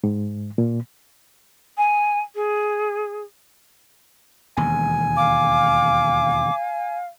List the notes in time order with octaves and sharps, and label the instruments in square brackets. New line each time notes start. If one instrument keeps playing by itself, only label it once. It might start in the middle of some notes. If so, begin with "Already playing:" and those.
[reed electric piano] G#2
A#2
[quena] G#5
G#4
[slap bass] E1 D#2 [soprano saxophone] G#5
[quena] F5 [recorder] D6